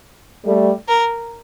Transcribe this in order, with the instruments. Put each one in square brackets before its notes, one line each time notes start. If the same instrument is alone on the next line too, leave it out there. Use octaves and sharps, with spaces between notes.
[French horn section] G3 A3
[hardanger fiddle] A#4